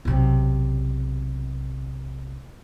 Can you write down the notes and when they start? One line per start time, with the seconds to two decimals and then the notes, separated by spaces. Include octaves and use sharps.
0.05 B1 C3